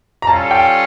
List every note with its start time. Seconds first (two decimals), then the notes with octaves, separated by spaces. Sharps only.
0.22 A#5
0.27 G3 C#4 F4 A4 A5
0.51 G5